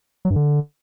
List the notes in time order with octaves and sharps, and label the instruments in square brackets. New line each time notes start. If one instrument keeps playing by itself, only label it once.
[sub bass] F#3
G2
D3